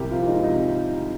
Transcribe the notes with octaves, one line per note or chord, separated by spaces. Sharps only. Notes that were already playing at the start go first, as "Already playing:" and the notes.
Already playing: C2 C3 G4 A#4
F3 F4
G#3 D#4
C3 D#4